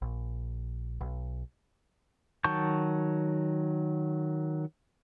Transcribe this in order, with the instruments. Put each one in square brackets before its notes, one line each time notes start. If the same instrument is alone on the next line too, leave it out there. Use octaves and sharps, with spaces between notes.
[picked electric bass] A#1
B1
[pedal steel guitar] D#3 F#3 A5 C#6 G6